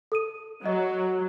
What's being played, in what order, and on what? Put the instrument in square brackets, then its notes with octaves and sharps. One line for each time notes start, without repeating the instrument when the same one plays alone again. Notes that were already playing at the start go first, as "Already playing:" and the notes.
[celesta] A4 D#6 D#7
[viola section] F#3 [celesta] D#5